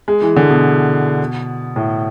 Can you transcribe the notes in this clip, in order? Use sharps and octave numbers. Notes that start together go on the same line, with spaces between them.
G#3
E3
D3
B2
A2